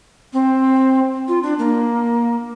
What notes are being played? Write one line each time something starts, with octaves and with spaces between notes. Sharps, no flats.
C4
F4
D4
A#3